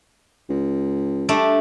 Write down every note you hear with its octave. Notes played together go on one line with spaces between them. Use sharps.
C#2
G3 A3 D4